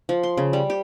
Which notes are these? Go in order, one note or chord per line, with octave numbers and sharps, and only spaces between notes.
F3
C6
C#3
G3
G4